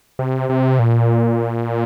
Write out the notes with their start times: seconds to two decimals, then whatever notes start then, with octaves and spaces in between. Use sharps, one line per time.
0.19 C3
0.49 C3
0.79 A#2